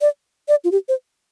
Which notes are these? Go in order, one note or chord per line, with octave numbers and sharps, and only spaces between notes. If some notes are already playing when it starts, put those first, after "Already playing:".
D5
D5
F4
G4
C5